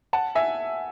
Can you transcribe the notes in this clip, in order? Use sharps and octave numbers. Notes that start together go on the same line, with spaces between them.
F#5 A5
E5 G#5